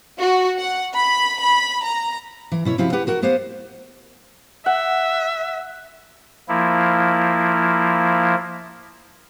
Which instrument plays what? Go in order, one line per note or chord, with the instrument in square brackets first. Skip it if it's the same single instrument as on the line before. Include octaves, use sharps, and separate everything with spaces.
[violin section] F#4
F#5
B5
B5
A#5
[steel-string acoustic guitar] E3
B2 E4 C#5
C3 F3 C4 E4 F#4 G4
G4 B4 F#5 A5
F#4 A#4 F#5
B3 G4 C5 D#5 F5 F#5
[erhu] E5 [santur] F#5
[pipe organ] F3 A#3 E4